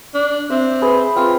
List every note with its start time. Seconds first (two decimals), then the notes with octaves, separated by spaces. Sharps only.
0.14 D4
0.50 C4 E5
0.82 G#4 B4
1.16 C4 F4